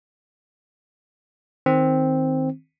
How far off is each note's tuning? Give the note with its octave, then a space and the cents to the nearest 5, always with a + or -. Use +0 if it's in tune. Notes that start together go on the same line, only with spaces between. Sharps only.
D#3 +10 C4 +0